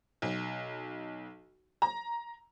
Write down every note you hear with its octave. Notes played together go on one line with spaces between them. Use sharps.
B1
A#5